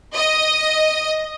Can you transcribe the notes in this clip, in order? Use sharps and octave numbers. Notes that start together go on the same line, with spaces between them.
D#5